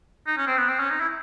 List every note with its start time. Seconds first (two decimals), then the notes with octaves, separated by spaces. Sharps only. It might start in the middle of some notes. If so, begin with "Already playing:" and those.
0.27 D#4
0.37 C#4
0.47 C4
0.57 B3
0.68 C4
0.79 C#4
0.90 D#4
1.01 E4